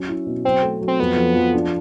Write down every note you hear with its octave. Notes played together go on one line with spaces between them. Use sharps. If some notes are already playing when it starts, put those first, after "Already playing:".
Already playing: F#3 C#4
E4
B2
F#3 C4
A3
F#3
C4
F2 B3
F3
F3
D4